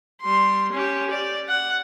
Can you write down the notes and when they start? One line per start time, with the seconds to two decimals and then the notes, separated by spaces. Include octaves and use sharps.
0.22 G3 C6
0.72 C#4 G4
1.10 D5
1.48 F#5